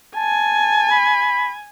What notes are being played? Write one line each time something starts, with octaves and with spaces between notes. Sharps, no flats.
G#5 A5
B5